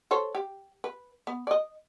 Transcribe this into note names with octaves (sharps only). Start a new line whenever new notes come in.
A4 C5 C#5
G4
B4
B3
D5 D#5